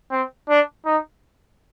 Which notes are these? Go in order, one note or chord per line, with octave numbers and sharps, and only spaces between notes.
C4
D4
D#4